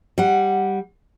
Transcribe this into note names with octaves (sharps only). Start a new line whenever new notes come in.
G3 F#5